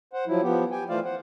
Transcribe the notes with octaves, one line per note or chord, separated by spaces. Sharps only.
C5 F#5
F3 F#3 E4
F3 B3 G4
G4 G5 G#5
E3 A3 F4 C5 D5 F5
C5 F#5